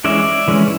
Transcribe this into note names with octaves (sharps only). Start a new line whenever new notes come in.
E3 G#3 C#4 D5 E5
E3 G#3 C#4